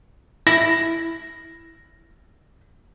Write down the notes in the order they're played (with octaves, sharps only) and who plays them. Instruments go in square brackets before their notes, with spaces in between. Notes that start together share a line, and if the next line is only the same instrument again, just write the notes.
[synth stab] E4 [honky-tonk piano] A#6